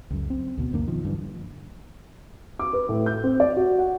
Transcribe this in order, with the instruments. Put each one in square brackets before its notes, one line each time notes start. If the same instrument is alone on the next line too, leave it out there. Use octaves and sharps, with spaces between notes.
[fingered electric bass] C#2 F#2
C4
D2 B2
C#2 F#2 D3 A#3
B2 D#3 F3
G2 D3 E3
[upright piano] D6
B4
A2
G6
C4
D5
F#4
F#5